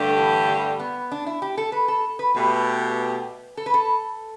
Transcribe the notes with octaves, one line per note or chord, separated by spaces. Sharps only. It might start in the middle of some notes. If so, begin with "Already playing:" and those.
Already playing: G2 D3 A3 G4
E3
G3
B3
D4
E4
G4
A4
B4
A4
B4
B2 A3 G4 B4
A4
B4
A4